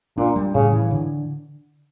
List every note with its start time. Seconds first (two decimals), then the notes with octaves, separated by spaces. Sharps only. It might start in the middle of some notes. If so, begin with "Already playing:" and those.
0.17 A#2 D4
0.36 G3
0.54 A2 C#3
0.73 E3
0.91 D3